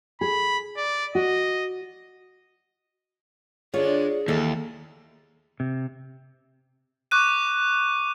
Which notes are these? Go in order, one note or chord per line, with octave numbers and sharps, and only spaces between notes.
G#4 B5
D5
F#4 D#5
D3 G#3 D4 F4 G#4 C#5
D#2 E3 D#4 A4
C3
C#6 D6 F#6 D#7